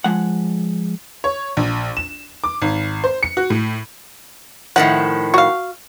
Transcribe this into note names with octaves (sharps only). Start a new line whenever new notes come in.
F3 G#3 F#5
C#5
A#1
E7
D6
G#1
C5
C#7
F#4
A2
A2 D#3 F3 F#5
F#4 F5